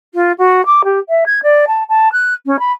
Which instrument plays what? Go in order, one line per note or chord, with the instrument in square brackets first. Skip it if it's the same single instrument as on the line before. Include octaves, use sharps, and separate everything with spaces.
[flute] F4
F#4
D6
G4
E5
G#6
D5
A5
A5
F#6
C#4
B5